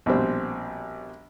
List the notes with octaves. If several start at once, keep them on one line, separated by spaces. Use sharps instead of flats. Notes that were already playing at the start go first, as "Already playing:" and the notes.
A#1 B2 G3 C4